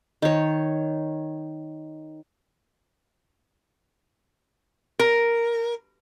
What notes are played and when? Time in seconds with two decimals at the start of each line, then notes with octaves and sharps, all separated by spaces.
0.22 D#3 C#5
4.99 A#4